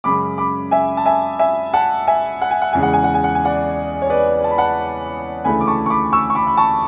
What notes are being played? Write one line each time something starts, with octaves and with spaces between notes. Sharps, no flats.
F#2 C#3 G#3 B5 D6
B5 D6
E5 G#5
A5
E5 G#5
E5 G#5
F#5 A5
E5 G#5
F#5
G#5
F#5
E2 C#3 G#3 G#5
F#5
G#5
F#5
G#5
F#5
G#5
D5 F#5
C#5
B4 D5
A5
B5
F#5 A5
D2 C#3 E3 A3 G#5 B5
D6
A5 C#6
C#6
B5 D6
C#6 E6
C#6
B5 D6
B5
A5 C#6